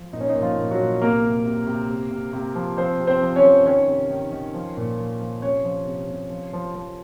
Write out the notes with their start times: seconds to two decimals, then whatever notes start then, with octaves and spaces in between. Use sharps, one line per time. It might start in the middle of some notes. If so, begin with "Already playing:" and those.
Already playing: F3
0.13 A#2 D#4
0.21 C#4
0.29 D#4
0.35 A#2
0.42 F3 F4
0.57 A#2
0.71 F#3 F#4
0.78 A#2
1.02 C3 A#3 A#4
1.23 C3
1.45 C3
1.67 C3
1.89 C3
2.11 C3
2.33 C3
2.55 F3
2.77 F3 C4 C5
2.99 C3
3.07 C4 C5
3.22 F3
3.36 C#4 C#5
3.43 F3
3.66 D#3 C#4 C#5
3.87 C3
4.11 D#3
4.32 D#3
4.54 F3
4.77 A#2
4.99 F3
5.20 F3
5.42 C3 C#4 C#5
5.65 F3
5.87 C3
6.09 C3
6.30 F3
6.53 F3
6.75 F3